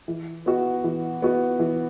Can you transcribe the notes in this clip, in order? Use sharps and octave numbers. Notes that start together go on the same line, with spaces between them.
E3
B3 F#4
E3
B3 F#4
E3